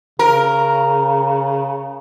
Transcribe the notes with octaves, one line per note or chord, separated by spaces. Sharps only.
C#3 A#4